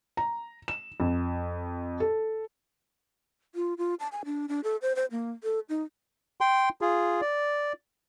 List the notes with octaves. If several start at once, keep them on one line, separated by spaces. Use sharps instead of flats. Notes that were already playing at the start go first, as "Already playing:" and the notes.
A#5
E7
F2
A4
F4
F4
A5
G#5
D4
D4
A4
C5
C5
A#3
A4
D#4
G5 C6
F4 G#4
D5